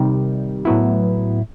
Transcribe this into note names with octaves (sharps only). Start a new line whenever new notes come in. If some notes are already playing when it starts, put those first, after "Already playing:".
Already playing: C3 D#3 G3
A2 F#3 B3 E4